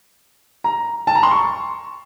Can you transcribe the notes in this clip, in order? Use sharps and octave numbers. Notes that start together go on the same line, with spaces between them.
A#5
A5
A#5
C6
C#6